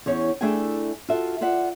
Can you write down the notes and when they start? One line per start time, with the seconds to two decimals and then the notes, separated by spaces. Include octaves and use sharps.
0.06 E2 C#4 C#5
0.41 A3 D4 E4 G#4 G5 G#5
1.09 F4 F#4 A4 E5
1.41 F4 D5 E5 F#5